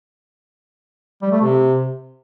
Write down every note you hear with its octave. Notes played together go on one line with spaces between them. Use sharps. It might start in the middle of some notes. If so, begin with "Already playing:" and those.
G3
A3
C3